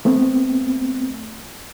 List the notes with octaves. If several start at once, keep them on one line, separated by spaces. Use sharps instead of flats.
A3 B3 C4